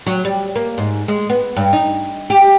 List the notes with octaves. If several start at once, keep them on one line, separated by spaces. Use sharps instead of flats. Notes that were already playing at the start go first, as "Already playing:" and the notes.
F#3
G3
A#3
G#2
G#3
B3
G2
D#4
G4